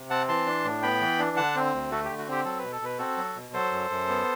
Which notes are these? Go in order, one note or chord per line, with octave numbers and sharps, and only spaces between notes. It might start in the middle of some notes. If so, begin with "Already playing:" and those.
Already playing: C3
C4 F#5 A5
E3 A5 C6
D4
A2
B3 G5 B5
E3
D4
D3 F#5 A5
C4
D2
A3 F#4 A4
D3 G4
F#4
C4 G4
F#3 A4
B2 B4
A4
B2 B4
C4 F#4 A4
F#3
B2
F#3 A4 C5
F#2
F#2
B3